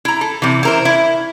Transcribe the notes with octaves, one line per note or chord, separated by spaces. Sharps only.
E4 A#5
A4
C3 E3
E4 A#4 C5
E4